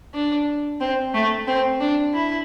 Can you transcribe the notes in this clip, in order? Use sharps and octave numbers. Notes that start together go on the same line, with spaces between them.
D4
C4
A3
C4
D4
E4